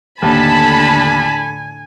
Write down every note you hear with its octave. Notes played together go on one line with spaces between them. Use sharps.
D#2 A2 D3 A4 G#5 A5 B5